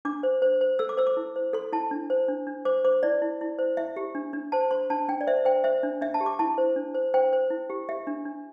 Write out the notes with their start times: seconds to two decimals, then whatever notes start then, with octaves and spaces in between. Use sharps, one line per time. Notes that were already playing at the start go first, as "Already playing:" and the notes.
0.05 D4 D6
0.23 C5
0.42 C5
0.61 C5
0.79 A4 E6
0.89 D6
0.97 C5 E6
1.07 D6
1.17 E4
1.36 C5
1.53 A4 C6
1.72 E4 A5
1.91 D4
2.10 C5
2.29 D4
2.47 D4
2.65 C5 D6
2.85 C5 D6
3.03 E4 D5
3.22 E4
3.41 E4
3.59 C5
3.77 E4 E5
3.96 G4
4.15 D4
4.33 D4
4.52 C5 A5
4.71 C5 C6
4.90 D4 A5
5.08 D4 G5
5.21 D5
5.27 C5 E5
5.45 C5 G5
5.64 C5 E5
5.83 D4
6.01 D4 E5
6.14 A5
6.21 G4
6.26 D6
6.39 E4 A5
6.58 C5
6.76 D4
6.94 C5
7.14 C5 G5
7.33 C5
7.50 E4
7.70 G4
7.89 G4 E5
8.07 D4
8.26 D4